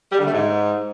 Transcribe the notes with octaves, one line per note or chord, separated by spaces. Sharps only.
G3
D3
A3
G#2